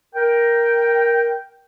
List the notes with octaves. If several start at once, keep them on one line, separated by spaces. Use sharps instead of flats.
A#4 G5